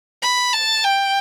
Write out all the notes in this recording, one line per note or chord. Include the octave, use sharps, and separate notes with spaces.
B5
A5
G5